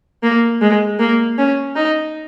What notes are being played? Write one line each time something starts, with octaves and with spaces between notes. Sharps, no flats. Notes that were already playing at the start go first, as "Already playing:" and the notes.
A#3
G#3
A#3
C#4
D#4